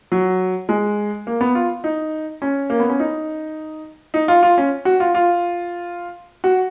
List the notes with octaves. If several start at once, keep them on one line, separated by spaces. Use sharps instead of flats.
F#3
G#3
A#3
B3
F4
D#4
C#4
A#3
B3
C#4
D#4
D#4
F4
F4
C#4
F#4
F4
F4
F#4